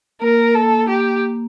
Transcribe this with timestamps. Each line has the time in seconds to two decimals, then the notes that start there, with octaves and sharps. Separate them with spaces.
0.21 A#3 A#4
0.55 A4
0.89 G4